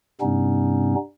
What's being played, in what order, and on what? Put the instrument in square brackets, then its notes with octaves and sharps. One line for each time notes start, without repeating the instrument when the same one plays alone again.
[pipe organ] G2 C3 G3 B3 C#4 D#4